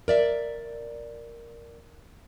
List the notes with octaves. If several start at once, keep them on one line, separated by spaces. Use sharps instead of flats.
A#4 D5 E5